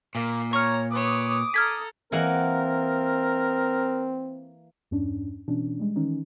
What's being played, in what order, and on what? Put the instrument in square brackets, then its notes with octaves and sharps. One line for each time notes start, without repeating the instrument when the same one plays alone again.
[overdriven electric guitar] A#2 [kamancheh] A#3
[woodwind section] C#5 [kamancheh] A#5 [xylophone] C#6 F6
[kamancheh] B4 C#5 [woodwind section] D6 D#6
[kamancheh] A4 A#5 [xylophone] F6 G#6 B6
[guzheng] E3 A#3 F#5 [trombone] C4 [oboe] A#4
[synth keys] E2 G2 C#4 D4
B2 E3 C#4 D4
G3 G#3
D#3 E3 C#4 D#4